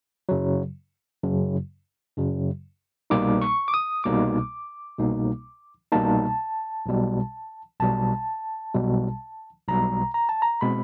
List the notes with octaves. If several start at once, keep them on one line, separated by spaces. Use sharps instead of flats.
F#2 C#3 F#3
F#2 C#3 F#3
F#2 C#3 F#3
C2 B2 G3 A#3 D#4 D6
C#6
D6
D#6
C2 B2 G3 A#3 D#4 D6
C2 B2 G3 A#3 D#4
C2 B2 G3 A#3 D#4 A5
B1 B2 G3
B1 B2 G3 A5
B1 B2 G3
B1 B2 G3 A#5
A#5
A5
A#5
B2 G#3 C4 B5